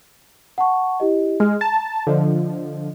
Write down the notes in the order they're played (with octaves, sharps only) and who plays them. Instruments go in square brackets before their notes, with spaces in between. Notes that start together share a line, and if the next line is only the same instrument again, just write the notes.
[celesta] F#5 A5 C#6
E4 G4 D#5
[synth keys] G#3 [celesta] F6
[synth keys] A5 [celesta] A#5
[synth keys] D3 F3 [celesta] D#5